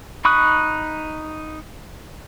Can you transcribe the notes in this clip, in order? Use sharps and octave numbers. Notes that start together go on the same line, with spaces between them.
D#4 B5 C#6 D#6 F#6